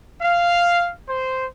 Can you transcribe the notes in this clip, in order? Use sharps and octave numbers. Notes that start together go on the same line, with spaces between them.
F5
C5